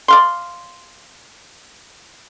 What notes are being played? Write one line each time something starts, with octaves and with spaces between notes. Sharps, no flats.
D5 F5 C6